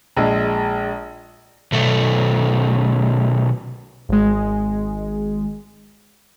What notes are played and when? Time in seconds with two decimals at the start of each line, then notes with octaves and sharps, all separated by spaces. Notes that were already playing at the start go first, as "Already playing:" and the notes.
0.17 A#1 G#3
1.72 B1 A3
4.09 G#1 G#3